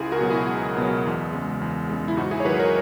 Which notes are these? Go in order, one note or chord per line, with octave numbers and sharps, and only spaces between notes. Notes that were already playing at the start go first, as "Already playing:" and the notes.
Already playing: C#2 E4 G#4
F#4 A#4
B2 F#3
E4 G#4
C#2
B2
F#3
E2
C#3 G#3
E2
C#3 G#3
E4
G#2 D#4 F#4
E4 G#4
C#5
D#3 F#3 G#4 B4
A#4 C#5